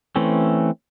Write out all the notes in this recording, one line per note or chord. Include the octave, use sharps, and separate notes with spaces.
E3 A3 C4 C#4